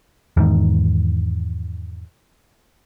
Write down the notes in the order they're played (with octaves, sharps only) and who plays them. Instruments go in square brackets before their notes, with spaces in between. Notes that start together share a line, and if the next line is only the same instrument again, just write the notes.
[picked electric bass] E2 G#2 D#3